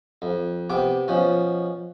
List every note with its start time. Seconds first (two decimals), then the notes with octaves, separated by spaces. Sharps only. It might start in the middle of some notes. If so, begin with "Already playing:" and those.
0.22 F2
0.70 C3 B3 G5 D6
1.08 B2 F3 C#4